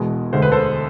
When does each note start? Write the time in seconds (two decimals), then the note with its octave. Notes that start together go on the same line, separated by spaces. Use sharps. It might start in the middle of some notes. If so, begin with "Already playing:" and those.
Already playing: E1 E2 B2 G#3
0.33 E1 D2 D3 G#3 C5
0.42 B4
0.52 A4 C5